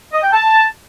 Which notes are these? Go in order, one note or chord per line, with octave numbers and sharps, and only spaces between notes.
D#5
G5
A5